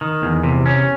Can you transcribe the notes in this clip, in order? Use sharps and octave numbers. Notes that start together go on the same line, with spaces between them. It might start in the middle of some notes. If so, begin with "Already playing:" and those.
D#3
E2
C3
C#4